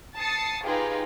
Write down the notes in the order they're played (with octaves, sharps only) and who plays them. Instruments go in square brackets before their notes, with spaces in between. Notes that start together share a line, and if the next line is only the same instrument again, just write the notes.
[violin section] A5 D#6 A6 C7 C#7
D#4 F4 G4 G#4 B4